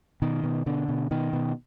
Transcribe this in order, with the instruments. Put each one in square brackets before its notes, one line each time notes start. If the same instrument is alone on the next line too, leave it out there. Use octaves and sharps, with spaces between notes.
[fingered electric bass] B2 D#3
B2
B2 D3
B2
B2 D#3
B2